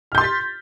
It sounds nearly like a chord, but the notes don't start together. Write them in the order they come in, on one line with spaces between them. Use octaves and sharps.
F6 G6 C6 A6 B6